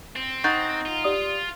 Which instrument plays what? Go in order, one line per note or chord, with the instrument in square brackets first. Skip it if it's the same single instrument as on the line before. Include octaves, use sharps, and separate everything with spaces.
[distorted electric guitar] C4
[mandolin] D#4 F#5 A#5 [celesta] C#6 F#6 A6
[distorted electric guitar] F4
[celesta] G4 D5 D#6